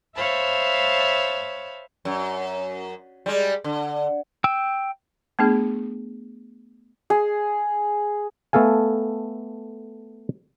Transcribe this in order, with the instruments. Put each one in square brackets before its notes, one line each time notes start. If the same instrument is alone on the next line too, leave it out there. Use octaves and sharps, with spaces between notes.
[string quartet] C5 C#5 E5 F5 A5 B5
[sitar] F#2
G3 G#3
D3
[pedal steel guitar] G5 E6
[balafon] A3 B3 D4 G#4
[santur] G#4
[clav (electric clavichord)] A3 B3 A4 F5 G#5